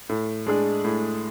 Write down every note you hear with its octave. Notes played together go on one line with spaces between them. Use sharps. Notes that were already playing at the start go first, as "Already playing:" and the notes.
A2
G#3 D4 G#4
A2